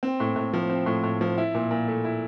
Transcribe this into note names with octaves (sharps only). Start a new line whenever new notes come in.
C4
A2
A2
F3
C4
A2
A2
F3
E4
A#2
A#2
A3
E4